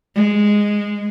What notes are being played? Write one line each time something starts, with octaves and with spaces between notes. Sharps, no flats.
G#3